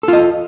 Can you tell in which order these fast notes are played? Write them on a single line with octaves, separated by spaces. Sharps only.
A4 F4 D#5